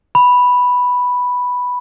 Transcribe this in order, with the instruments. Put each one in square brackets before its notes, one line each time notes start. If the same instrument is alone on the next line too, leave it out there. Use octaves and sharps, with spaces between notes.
[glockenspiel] B5